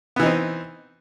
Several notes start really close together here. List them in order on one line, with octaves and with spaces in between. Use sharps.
B3 E3 D#4 C4